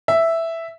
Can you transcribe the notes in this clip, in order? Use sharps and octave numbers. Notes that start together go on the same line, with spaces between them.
E5